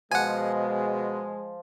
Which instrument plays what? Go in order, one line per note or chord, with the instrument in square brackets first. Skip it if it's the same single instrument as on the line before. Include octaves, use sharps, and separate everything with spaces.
[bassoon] B2 [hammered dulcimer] F3 [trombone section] G#3 [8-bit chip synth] F#5 G#5